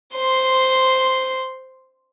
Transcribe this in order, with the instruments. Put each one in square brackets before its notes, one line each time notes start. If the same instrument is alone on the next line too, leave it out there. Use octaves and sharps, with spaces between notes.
[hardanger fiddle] C5 C6